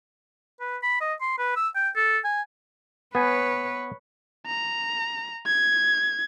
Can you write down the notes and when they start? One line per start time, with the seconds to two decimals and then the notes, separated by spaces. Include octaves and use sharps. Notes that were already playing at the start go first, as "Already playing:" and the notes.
0.61 B4
0.83 B5
1.01 D#5
1.21 C6
1.38 B4
1.56 E6
1.75 G5
1.96 A4
2.24 G#5
3.15 B3 B4 C#5 G#5
4.46 A#5
5.47 G#6